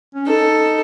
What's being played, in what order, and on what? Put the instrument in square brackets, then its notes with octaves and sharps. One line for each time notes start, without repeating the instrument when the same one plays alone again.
[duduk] C#4
[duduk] D#4 [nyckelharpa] A4